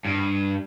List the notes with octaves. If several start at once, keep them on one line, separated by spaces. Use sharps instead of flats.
G2